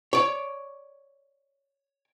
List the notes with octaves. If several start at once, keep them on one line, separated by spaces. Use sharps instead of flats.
C#5 D5